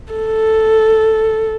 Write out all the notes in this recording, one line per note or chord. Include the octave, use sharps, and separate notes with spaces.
A4